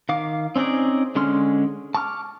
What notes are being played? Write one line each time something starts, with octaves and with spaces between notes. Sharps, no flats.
D#3 F5 D6
C4 C#4 D#4 G#4 D5
D3 G#3 C#4 C6 F6
A5 C#6 D6 F6